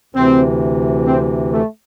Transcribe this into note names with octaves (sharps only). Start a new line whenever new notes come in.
D2 C3 E3 C4
C4
A3